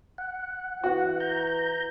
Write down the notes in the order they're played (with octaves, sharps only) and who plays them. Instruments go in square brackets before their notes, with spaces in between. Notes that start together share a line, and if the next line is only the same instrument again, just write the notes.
[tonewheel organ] F#5
[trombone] E3 [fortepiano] F#4
[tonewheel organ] A#5 G6